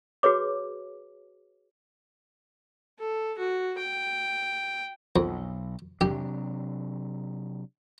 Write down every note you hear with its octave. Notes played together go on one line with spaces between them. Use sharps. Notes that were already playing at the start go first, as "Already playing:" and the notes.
F#4 G#4 B4 C#5 D6
A4
F#4
G5
B1 F2
C3 F#3 D4 G4